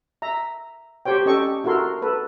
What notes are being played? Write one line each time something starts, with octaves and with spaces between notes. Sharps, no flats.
E5 A#5
G4 C5 C#5 G5
C#4 G4 A4 D#5 G5 C#6
E4 F#4 A4 A#4 C6
A4 B4